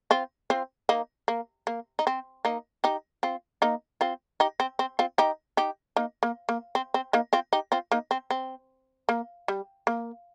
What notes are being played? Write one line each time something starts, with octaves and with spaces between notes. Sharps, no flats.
C4 F4
C4 F4
A#3 D#4
A#3
A#3
D#4
C4
A#3 D#4
D#4 G4
C4 F4
A#3 D#4
C4 F4
D#4 G4
C4
C4
C4 F4
D#4 G4
D#4 G4
A#3 D#4
A#3
A#3
C4
C4
A#3 D#4
C4 F4
D#4 G4
C4 F4
A#3 D#4
C4
C4
A#3
G3
A#3